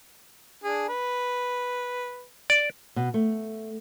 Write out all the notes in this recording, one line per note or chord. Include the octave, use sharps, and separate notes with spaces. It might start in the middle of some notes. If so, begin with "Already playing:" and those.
D4 G#4
B4
D5 D7
B2
A3